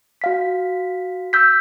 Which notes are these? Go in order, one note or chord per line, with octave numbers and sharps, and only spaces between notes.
F#4 F5 B6
E6 G6 B6